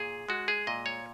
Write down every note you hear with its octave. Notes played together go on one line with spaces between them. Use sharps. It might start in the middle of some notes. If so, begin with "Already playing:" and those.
Already playing: A#2 G#4
G#3 F#4
G#4
A#2 D#5
C#5